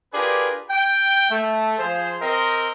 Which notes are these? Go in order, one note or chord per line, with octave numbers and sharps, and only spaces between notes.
D4 F4 G4 G#4 A#4 B4
G5
A3
F3 F4 G#4 C5
C4 A#4 D#5